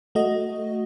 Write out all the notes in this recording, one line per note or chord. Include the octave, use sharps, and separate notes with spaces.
A3 F#4 D#5